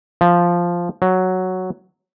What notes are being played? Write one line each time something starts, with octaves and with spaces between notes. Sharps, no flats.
F3
F#3